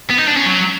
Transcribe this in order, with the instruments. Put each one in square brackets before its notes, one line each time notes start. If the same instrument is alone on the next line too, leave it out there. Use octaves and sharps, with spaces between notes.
[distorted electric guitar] B3
D#4
D4
C#4
F#3